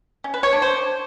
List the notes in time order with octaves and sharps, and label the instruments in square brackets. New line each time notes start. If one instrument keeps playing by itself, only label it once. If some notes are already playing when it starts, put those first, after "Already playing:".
[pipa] C#4
B4
C#5
D4
C5